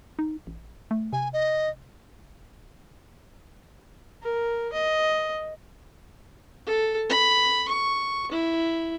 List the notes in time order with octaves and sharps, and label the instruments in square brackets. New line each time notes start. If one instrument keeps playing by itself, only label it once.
[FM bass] D#4
A1
A3
[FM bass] C3 [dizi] G#5
[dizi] D#5
[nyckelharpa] A#4
D#5
A4
B5
C#6
E4